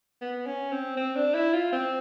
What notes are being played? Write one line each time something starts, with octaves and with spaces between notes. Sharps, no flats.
B3
C#4
C4
C4
D4
E4
F4
C4